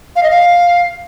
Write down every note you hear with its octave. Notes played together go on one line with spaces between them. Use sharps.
F5
D#5
F5